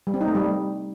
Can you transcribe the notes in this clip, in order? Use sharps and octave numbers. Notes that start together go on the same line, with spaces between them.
G3
C4
D#4
A3
G3